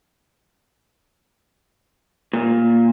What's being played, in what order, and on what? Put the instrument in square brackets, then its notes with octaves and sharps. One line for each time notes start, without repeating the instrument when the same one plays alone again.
[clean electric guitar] A#2